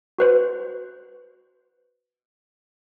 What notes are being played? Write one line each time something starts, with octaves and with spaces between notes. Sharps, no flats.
F#4 B4 C5